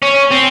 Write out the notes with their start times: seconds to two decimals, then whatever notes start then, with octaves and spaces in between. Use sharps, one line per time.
0.02 C#4
0.31 C4